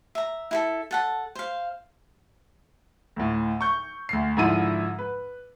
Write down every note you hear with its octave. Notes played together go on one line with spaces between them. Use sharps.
E5 A#5
E4 G#4 A4
A4 F#5 A5
C5 F5
D2 A2
C#6 G6
D2 C7
G#2 D3 F3 E4 E5 D#7
B4